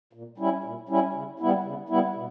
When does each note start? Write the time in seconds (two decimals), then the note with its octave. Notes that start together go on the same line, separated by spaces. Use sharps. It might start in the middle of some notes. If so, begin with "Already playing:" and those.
0.13 A#2
0.38 G3 C#4 E4
0.64 A#2
0.89 G3 C#4 E4
1.13 C#3
1.39 G3 B3 E4
1.64 C#3
1.89 G3 B3 E4
2.15 B2